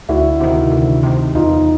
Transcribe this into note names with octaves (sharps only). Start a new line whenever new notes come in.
D2 E4 F#4
C3 D#3
D2
C3 D#3
E2 D#4 F4